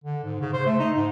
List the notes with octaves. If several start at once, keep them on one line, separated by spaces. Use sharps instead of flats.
D3
G#2
C#3
C5
A3
D#4
G#2